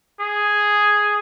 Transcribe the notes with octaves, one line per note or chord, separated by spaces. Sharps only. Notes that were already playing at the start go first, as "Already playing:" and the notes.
G#4